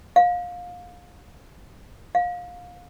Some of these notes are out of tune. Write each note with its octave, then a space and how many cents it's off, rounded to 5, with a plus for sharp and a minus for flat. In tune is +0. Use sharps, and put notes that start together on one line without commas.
F5 +25
F5 +25